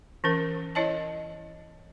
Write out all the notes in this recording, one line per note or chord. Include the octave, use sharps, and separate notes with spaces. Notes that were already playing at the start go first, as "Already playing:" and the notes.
E3 C#4 A#4
E4 C#5 D#5 A5